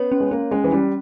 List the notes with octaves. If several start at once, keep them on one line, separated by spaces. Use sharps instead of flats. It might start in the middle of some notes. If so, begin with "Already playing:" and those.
Already playing: B3 C#4 C#5
C#4
G#3
A#3 C#4
G#3 C#4
E3
G3 C#4